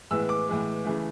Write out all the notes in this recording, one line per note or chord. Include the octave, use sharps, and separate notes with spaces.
A2 E3 G#3 B3 E6
D6
A2 E3 G#3 B3
C#3 E3 A3